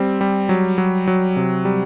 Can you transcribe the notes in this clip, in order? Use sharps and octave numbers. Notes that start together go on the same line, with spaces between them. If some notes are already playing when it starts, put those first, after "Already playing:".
Already playing: G3 C4
G3
F#3
F#3
F#3
C3
G3